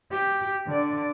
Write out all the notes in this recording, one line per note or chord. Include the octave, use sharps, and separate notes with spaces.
G4
D3 D5